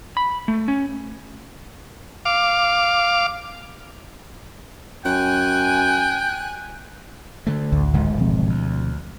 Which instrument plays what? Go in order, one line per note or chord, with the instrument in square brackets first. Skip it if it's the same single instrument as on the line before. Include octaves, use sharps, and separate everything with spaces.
[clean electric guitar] B5
A3
C#4
[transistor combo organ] F5 D6
[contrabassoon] F#2 [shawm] G5 [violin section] G#5 [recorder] F#6
[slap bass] D3 A3
[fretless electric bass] A1 D2
[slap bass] D1 G#1 G#2
[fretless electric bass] B2 F3 C4
[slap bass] D2